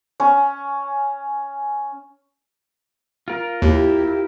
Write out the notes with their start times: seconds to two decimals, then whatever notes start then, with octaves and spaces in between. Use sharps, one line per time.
0.20 C#4 C#6
3.28 F4 A#4
3.62 D#2 E4 G4